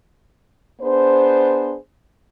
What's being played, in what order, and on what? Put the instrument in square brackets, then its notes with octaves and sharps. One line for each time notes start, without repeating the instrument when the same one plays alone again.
[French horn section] B3 D4 G#4 C5